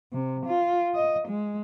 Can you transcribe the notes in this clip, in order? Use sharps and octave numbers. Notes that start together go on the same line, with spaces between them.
C3
F4
D#5
G#3